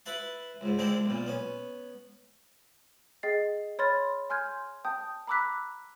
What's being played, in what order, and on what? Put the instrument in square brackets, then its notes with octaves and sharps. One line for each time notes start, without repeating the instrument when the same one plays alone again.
[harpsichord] E4 B4 E5 F#5 A5 C6
C#2 G#2
D3 G#3 C4 D4 E4 A#4
B1 A#2
B3 C#4
[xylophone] G#4 D#5 G5 A6 C7
C#5 B5 C6 F6 A6
G#5 C6 F6 G6 G#6
G5 A5 D#6 G6
A#5 B5 D6 E6 F#6 B6